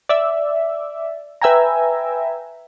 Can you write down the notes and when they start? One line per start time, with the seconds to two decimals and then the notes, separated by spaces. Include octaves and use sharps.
0.09 D5 E5
1.42 B4 E5 G5 G#5 A#5